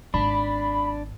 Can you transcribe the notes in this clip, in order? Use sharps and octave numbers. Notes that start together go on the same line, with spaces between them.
G#1 D4 B5